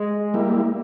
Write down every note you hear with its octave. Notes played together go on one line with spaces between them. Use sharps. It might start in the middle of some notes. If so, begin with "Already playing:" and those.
Already playing: G#3
G3 A#3 E4